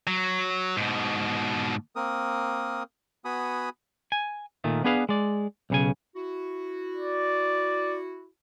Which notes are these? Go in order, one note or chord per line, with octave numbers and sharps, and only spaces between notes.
F#3
G#2 B2
A#3 C4 A#4 D#6
B3 F#4 G#5 B5 D#6
G#5
A#2 D#3 A3
B3 D4 G#4 B4 F5
G#3 D5
B1 C#3 G#5
E4 F#4
D5